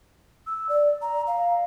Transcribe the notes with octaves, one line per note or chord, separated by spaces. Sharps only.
E6
D5
A#5
F5